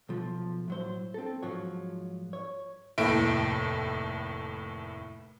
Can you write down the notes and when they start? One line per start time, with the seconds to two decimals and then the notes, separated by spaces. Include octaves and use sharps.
0.09 B1 F3
0.68 A2 F#3 C5
1.14 C4 A4
1.43 G#2 F3 F#3 C#5
2.33 C#5
2.98 F1 D#2 A2 E4 D7